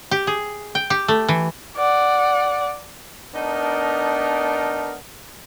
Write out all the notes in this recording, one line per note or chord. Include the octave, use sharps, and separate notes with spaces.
G4
G#4
G5
G4
A3
E3
D5 F#5
A3 B3 D4 D#4 A#4